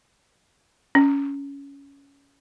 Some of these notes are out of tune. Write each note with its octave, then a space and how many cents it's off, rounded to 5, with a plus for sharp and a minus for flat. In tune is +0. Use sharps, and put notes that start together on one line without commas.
C#4 +15